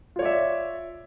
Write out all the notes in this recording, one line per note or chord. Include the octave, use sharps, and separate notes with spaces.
F4 C#5 D5 E5